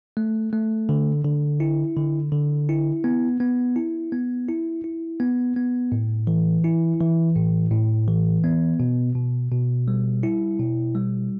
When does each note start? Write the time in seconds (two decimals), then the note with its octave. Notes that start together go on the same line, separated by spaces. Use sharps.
0.17 A3
0.53 A3
0.89 D3
1.24 D3
1.60 E4
1.97 D3
2.32 D3
2.69 E4
3.04 B3
3.40 B3
3.76 E4
4.12 B3
4.49 E4
4.84 E4
5.20 B3
5.56 B3
5.92 A2
6.27 E3
6.64 E4
7.00 E3
7.35 A2
7.71 A2
8.08 E3
8.44 B3
8.80 B2
9.15 B2
9.52 B2
9.88 G3
10.23 E4
10.59 B2
10.95 G3